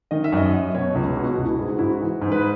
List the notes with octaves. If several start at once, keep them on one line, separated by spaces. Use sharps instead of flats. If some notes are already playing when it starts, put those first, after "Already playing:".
D#3 D#5
E5
F#2 D#5
F#2
B2 C#5
C#2
B2 F#4
F#4
C#2
E4
G#2 G#4
F#4
G#2 E4
F#4
E3
G#2
B4